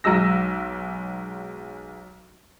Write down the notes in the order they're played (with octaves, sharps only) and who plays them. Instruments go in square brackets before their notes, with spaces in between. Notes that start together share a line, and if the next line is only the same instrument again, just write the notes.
[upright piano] B1 F#3 G#3 E6 A#6